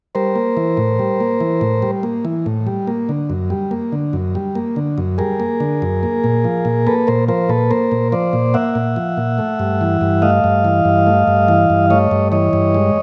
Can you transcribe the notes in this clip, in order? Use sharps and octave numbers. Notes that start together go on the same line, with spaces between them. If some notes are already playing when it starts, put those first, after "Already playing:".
G3 A#4 C5
A#3
E3
A2
G3
A#3
E3
A2
G3
A#3
E3
A2
G3
A#3
D3
F#2
G3
A#3
D3
F#2
G3
A#3
D3
F#2
G3 G#4 A#4
A#3
D3
F#2
A#3
A#2
F3
A#2
A#3 A4 B4
A#2 A#4 C5
F3 A#4 C5
A#2 A4 B4
A#3 A#4 C5
A#2
F3 C5 D5
A#2
A#3 E5 F#5
A#2
F3
A#2
A3
G2
E3
G2
A3 D#5 F5
G2
E3
G2
A3
G2
E3
G2
A3 C#5 D#5
G2
E3 C#5 D#5
G2
G#3